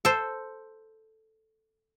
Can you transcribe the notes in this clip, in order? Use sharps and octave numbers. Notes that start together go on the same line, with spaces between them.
A4 C5